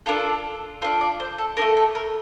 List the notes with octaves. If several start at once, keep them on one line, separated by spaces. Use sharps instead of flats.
D4 F4 A4 A#4
D4 F4 A4 C5
D5
C5
A4
A3 D4 A4 A#4
A4
A#4